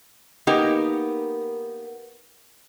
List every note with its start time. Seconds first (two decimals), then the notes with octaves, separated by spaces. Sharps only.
0.47 A#3 B3 D#4 G4 A#4